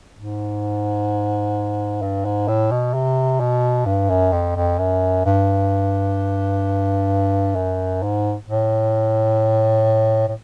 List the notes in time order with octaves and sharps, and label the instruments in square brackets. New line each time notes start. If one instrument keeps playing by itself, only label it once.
[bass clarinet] G#2
G2
G#2
A2
B2
C3
B2
G2
F#2
F2
F2
F#2
G2
F#2
G#2
A2
A2